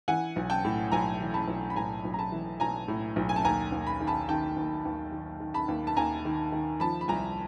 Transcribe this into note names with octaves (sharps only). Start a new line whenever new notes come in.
E3 F#5 G#5
B1
G5 A5
A2
B1 G#5 A#5
E3
A5 B5
B1
B5
A2 G#5 A#5
B1
A#5
A5 B5
E3
B1 G#5 A#5
A2
B1
G#5
A5
D#2 G#5 A#5
D#2
B5
D#3
A5 B5
D#3 G5 A5
D#2
D#2
D#3
D#3
A5 B5
D#2
A5
D#2 G#5 A#5
D#3
D#3
F3 A5 B5
B5
C2 G#5 A#5